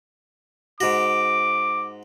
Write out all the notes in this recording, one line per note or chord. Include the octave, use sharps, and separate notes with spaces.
G#2 F#4 D6